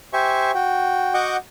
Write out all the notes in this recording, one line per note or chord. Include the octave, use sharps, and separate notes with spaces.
G4 C5 E5 G#5 C#6
F#4 G5
F#4 D#5 F#5 C#6 D6 G6